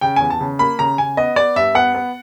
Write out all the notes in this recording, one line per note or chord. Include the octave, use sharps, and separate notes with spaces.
C#3 G5
E2 G#5
A5
C#3
A#3 B5
C#3 A#5
C#3 G#5
B3 D#5
B3 D5
G2 E5
B3 F#5
B3